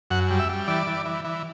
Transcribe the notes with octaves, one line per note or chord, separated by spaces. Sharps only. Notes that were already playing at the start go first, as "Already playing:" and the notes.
F#2 F#5
G3
E5
G3
E3 D5
E3
E3
E3